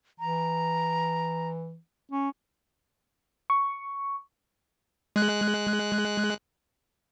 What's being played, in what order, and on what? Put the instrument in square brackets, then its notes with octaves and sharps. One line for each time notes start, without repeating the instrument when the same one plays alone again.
[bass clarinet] E3 [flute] A#5
[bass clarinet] C#4
[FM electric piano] C#6
[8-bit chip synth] G#3 F#6